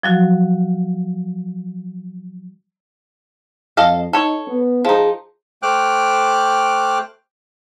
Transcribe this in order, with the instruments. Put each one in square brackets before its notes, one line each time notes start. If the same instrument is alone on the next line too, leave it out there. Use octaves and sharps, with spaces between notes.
[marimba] F3 F#3 F#4
[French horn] F2 [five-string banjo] A4 D#5 F5
[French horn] D#4 [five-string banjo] A4 C#5
[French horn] B3
[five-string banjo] F3 D#4 [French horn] G#4
[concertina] A3 C5 G5 D6 F6 F#6